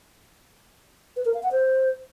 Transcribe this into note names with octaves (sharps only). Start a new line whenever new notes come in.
B4
A#4
F5
F#5
C5